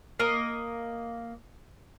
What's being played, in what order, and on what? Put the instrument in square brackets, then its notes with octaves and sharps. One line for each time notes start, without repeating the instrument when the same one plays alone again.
[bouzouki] A#3 D#5